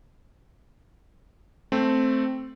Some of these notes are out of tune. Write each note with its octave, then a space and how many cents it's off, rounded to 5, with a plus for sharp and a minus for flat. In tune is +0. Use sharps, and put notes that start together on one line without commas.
A3 +0 C4 +0